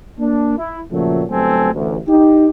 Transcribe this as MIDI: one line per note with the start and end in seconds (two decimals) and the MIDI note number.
0.19 0.55 58
0.19 0.55 62
0.58 0.79 64
0.91 1.23 46
0.91 1.23 49
0.91 1.23 53
0.91 1.23 54
0.91 1.23 57
1.29 1.73 31
1.29 1.73 54
1.29 1.73 57
1.29 1.73 60
1.29 1.73 69
1.29 1.73 80
1.74 1.96 33
1.74 1.96 38
2.07 2.49 63
2.07 2.49 67